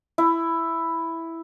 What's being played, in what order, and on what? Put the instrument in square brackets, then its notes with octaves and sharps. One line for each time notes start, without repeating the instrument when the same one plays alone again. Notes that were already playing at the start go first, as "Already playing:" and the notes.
[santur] E4